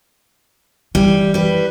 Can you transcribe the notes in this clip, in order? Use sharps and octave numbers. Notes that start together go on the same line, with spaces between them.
E3 G3
G3 B4